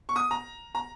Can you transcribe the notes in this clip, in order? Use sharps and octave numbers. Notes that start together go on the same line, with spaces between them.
C#6
D#6
A#5
A#5